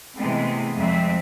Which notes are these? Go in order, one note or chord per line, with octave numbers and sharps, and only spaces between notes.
C3 E3 G#3 A3 B3 C4
F2 G3 G#3 C4 E5